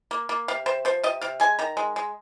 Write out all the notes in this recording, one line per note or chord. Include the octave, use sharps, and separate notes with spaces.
A#3
A#3
C3 F5
C3 C5
F3 C5
C3 D#5
C3 F5
G#3 G#5
D#3 A#5
G#3
G#3